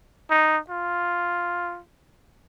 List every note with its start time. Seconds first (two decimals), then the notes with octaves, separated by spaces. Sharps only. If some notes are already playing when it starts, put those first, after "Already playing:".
0.30 D#4
0.70 F4